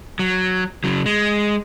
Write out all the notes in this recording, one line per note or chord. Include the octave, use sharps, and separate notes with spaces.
F#3
C#3 F#3
G#3